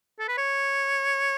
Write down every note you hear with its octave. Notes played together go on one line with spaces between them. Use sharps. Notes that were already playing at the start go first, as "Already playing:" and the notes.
A4
B4
C#5